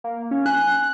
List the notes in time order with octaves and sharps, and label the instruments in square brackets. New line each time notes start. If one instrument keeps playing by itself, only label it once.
[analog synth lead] A#3
C#4
[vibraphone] G#5 [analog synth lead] F#6